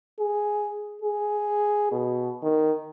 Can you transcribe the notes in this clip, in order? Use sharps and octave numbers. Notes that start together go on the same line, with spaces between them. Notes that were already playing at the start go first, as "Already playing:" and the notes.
G#4
G#4
B2
D#3